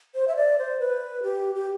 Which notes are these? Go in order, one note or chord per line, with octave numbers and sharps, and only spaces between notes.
C5
E5
D5
C5
B4
G4
G4